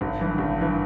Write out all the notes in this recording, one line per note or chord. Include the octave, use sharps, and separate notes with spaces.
G#1
G2 E3
G#1
G2 E3